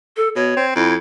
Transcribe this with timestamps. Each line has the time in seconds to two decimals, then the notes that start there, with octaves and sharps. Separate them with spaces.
0.17 A4
0.36 B2 C#5
0.56 C4
0.75 F2 E4